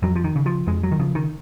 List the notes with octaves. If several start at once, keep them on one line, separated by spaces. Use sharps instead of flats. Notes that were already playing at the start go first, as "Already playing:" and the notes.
F2 F#3
F3
D#3
C#3
F3
F2 G#3
F#3
D#3
C#3 F3
D#3